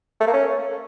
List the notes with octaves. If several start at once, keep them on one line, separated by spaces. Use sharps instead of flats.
A3
A#3
C#4